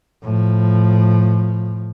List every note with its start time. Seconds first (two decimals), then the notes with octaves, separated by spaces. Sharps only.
0.23 A2 F3